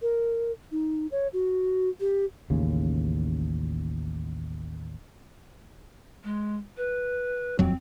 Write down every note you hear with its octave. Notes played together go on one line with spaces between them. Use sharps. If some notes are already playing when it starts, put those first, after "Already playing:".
A#4
D#4
C#5
F#4
G4
A1 D#2 C#3
G#3
B4
D#1 F2 F#3 C4